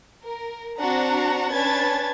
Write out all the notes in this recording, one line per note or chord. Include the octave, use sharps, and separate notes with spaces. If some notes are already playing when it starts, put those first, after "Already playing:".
A#4
C4 D4 F#4 F#5 A#5
C#4 D4 B4 A5 G#6 A6